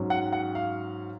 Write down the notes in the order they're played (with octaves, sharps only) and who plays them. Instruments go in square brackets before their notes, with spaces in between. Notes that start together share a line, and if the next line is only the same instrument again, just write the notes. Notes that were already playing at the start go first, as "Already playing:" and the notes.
Already playing: [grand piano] G#2 F#3 C#4
F#5
F#5
F5